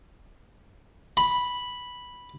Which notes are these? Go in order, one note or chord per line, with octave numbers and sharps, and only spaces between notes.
B5